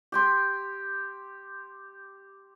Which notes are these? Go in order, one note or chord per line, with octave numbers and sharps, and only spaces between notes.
G4 G5 C6